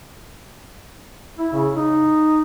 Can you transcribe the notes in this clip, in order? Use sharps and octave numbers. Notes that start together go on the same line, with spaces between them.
E4
C#3
D#4